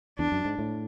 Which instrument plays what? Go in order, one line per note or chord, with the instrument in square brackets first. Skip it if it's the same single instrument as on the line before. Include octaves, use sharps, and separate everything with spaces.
[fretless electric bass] E2 [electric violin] D4
[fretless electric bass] F#2
G#2
A2